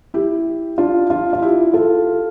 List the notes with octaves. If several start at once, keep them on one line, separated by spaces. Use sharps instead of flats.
E4 G4
D4 F4
D4 F4
F4
E4 G4
F4 A4